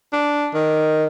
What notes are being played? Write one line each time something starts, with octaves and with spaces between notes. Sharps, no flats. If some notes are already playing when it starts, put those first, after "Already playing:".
D4
D#3